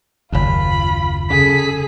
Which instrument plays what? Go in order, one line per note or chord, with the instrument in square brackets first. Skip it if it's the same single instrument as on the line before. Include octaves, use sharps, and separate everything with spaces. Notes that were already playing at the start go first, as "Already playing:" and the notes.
[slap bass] F#1 D#2 [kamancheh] F4 B5
[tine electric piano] C#3 [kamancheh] G#4 A4 [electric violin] B6